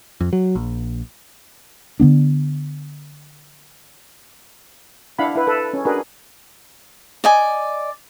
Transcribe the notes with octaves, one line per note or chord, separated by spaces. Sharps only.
F2
F#3
A#1
D3 D#3 B3 D4
D4 E4 F5 F#5 B5
E4 B4
A4 B4
C#4
D4 F#4 G#4 A#4 B4
D5 D#5 G#5